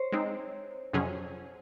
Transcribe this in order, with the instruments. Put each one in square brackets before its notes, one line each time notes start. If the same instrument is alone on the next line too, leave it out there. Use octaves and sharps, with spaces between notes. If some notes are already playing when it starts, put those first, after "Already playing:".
Already playing: [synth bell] C5 C#5
[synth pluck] G#3 C4 D#4 [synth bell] C5
[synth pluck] F2 C3 F#3 C#4 G#4